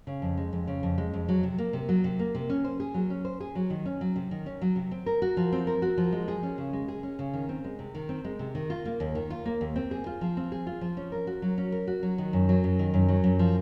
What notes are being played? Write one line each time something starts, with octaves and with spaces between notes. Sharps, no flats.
C#3
F2
G#3
F2
C#3
F2
G#3
F2
F#3
C3
A#3
C3
F#3
C3
A#3
C3
C#4
C5
G#4
F#3
C#4
C5
G#4
F#3
D#3
C#4
F#3
C3
D#3
C#4
F#3
C3
C4
A#4
F#4
F3
C4
A#4
F#4
F3
G#3
G#4
C#4
C#3
G#3
G#4
C#4
C#3
D#3
C4
G#3
C3
D#3
C4
G#3
C3
D#3
F4
A#3
D#2
D#3
F4
A#3
D#2
C4
G#4
F4
F3
C4
G#4
F4
F3
C#4
A#4
F#4
F#3
C#4
A#4
F#4
F#3
D#3
F#2
F#3
F#2
D#3
F#2
F#3
F#2
F3